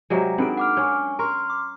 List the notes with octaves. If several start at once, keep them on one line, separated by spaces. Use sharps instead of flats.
C3 F#3 G#3 D5 A#5
B3 C4 D4 D#4 G#4 A#4 D7
F#5 D6 F6
C#4 D4 G#5 C#6
A#4 A#5 C6 C#6 F6
D6